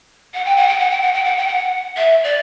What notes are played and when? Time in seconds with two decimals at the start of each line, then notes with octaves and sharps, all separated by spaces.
0.34 F#5
0.45 G5
0.56 F#5
0.68 G5
0.79 F#5
0.90 G5
1.02 F#5
1.13 G5
1.24 F#5
1.36 G5
1.48 F#5
1.97 E5
2.24 D5